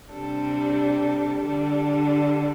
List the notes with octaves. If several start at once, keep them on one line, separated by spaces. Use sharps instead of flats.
C3 G3 D4 A4
D3 G3 D4 A4